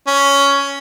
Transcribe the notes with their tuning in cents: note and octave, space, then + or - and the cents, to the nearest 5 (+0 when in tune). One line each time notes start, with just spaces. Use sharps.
C#4 +10